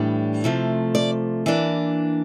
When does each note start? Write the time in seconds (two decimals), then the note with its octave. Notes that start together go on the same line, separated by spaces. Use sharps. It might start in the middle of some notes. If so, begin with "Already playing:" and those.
Already playing: A2 E3 G3 D4
0.44 C3 F3 A3
0.95 D5
1.46 E3 A#3 D4